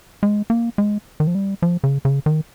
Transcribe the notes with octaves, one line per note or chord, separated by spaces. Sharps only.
G#3
A#3
G#3
D#3
F3
G3
F3
C#3
C#3
D#3